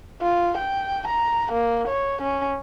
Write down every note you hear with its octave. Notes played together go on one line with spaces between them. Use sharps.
F4
G5
A#5
A#3
C#5
C#4